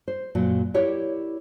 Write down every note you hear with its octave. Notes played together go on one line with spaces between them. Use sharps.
C5
F#2 A#2 F#3
E4 G4 A#4 C#5 D5